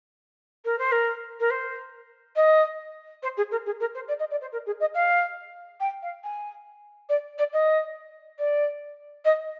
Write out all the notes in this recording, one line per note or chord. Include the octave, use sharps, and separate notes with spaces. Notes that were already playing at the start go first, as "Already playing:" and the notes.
A#4
C5
A#4
A#4
C5
D#5
C5
G#4
A#4
G#4
A#4
C5
D5
D#5
D5
C5
A#4
G#4
D#5
F5
G5
F5
G#5
D5
D5
D#5
D5
D#5